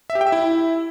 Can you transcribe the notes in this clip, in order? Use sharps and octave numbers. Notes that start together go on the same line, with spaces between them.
E5
G4
G5
E5
E4